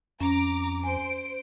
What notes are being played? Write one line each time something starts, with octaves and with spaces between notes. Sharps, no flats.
F2 C#4 A#5 D6
C5 G#5 D7